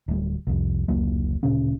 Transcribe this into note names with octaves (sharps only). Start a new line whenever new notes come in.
D1 G3
C2 F2
F1 C#2 F#3 A#3
D1 A#2 C#3 C#4